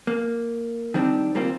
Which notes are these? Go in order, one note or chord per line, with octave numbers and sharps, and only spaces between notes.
A#3
D#3 G3 C4 D4
G3 A#3 C4 F4